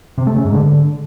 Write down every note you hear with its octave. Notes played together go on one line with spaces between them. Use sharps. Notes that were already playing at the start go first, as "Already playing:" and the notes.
C3
A3
C#3
G#2
D3